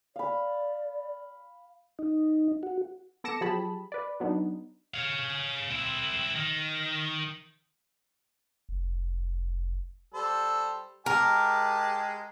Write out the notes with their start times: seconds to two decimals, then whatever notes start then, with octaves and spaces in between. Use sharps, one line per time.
0.16 D5 F5 B5
1.99 D#4
2.63 F#4
3.24 B3 A4 D6 A#6 C#7 E7
3.41 F3 F#3 G4 G#4 A5 B5
3.92 B4 D5
4.20 F#3 B3 D4 D#4
4.94 C#5 F5
5.70 C4 E4
6.36 D#3
8.69 F1
10.14 G3 A4 C5
11.06 G#3 G4 A#4 A5